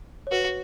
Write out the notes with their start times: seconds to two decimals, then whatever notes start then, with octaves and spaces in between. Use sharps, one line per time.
0.27 C#5
0.32 F#4 B4